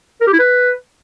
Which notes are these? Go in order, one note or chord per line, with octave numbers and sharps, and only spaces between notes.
A#4
G4
E4
B4